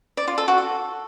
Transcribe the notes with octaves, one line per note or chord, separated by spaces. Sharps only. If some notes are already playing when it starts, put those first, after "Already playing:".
D5
F4
A4
F#4
A4